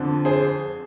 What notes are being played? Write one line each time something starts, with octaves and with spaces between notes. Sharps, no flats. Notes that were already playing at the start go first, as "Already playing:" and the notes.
Already playing: F2 D3 F3
G#4 C5